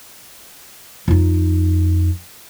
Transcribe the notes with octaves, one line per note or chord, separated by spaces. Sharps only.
F2 D#4